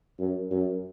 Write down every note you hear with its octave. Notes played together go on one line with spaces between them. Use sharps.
F#2
F#2